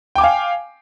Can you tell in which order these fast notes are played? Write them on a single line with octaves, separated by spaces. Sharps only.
G5 D6 G#5 F5